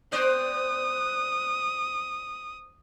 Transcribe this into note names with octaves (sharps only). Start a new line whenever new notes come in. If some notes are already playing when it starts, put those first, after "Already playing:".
B3 C5 D5 D#6